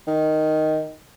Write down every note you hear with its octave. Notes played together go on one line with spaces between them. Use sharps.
D#3